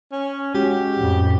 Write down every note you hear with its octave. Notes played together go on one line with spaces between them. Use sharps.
C#4
G#3 C#4 F#4 G4
F2 A2